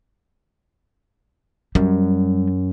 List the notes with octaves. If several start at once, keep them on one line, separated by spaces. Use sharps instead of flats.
F#2 G3